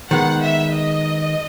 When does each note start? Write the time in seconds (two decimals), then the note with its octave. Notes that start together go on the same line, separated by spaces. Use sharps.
0.11 D#3 G#3 B3 F#5
0.43 E5
0.74 D#5